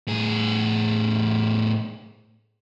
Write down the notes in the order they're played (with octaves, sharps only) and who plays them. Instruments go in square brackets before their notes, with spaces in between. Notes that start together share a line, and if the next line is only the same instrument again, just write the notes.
[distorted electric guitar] A2 G#4